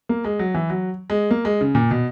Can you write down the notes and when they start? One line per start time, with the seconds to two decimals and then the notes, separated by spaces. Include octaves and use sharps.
0.09 A#3
0.25 G#3
0.39 F#3
0.55 E3
0.70 F#3
1.10 G#3
1.31 A#3
1.45 G#3
1.61 C#3
1.75 A#2
1.91 B2